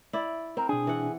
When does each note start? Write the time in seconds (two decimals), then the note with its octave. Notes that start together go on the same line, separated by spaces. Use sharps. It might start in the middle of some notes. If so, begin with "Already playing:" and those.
0.13 E4 D5
0.57 C4 A#4
0.69 B2 D4 G#4
0.87 E3 F#5